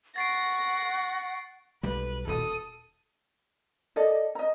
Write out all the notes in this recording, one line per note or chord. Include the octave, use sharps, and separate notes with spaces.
F#5 C#6 A6 A#6 C7 D7
B1 G3 B4
D#1 B2 A4 D#6
A4 D5 D#5
D#5 A#5